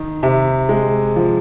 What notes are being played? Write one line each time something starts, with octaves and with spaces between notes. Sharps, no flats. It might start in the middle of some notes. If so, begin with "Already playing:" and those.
Already playing: D#3
C3 E5
G#3
F3